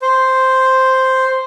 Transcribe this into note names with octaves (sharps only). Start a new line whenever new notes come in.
C5